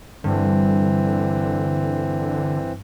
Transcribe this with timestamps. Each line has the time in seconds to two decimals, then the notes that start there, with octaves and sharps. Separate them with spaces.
0.24 G2 D3 E3 C4